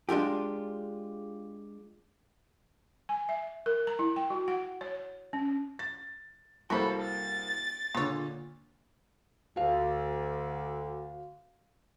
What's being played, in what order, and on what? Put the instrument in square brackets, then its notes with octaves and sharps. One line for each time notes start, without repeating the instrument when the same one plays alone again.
[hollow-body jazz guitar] G#3 D4 F4 G4
[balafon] G#5
E5
A#4
A#5
E4
G5
F#4
F#5
C#5
C#4
[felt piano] A6
[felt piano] C2 A#3 C5 [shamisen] F#4 E5 B5 [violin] A4
[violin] A6
[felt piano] A#2 D3 [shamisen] G#3 C#5
[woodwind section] D2 D3 [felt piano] F#4 F5